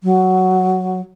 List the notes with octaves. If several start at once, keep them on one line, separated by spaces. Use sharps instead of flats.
F#3